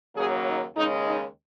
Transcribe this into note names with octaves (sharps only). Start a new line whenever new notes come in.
D#2 C#3 F#3 A#3 G#4
D#4
D#2 C#3 G#3 D#4
D#4